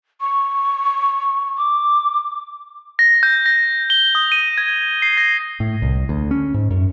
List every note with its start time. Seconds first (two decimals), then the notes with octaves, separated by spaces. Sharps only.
0.21 C#6
1.57 D6
2.99 A#6
3.23 G6
3.46 A#6
3.90 G7
4.15 D#6
4.32 D#7
4.58 G#6
5.02 C7
5.17 A#6
5.60 A2
5.82 C2
6.09 D2
6.31 C#4
6.54 G#2
6.71 F#2